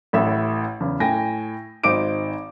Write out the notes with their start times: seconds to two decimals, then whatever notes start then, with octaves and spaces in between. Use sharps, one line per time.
0.13 A1 A2 E5
0.80 E2 C#3
1.00 A2 G5 G#5 A#6
1.84 G#1 D#4 C5 D6 D7